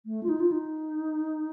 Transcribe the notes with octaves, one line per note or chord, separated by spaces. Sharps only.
A3
F4
D#4
F4
D#4